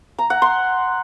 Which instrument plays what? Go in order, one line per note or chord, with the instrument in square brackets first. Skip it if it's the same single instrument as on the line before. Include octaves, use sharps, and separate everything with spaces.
[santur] A#5
F#5
C6